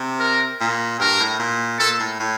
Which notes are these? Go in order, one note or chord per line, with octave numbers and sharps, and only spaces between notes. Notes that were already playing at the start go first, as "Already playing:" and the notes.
Already playing: C3
A#4
A#2
G2 A#4
A2
A#2
A#2 A4
A2
A2